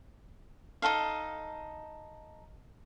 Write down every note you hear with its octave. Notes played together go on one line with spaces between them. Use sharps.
D#4 E4 A4 F5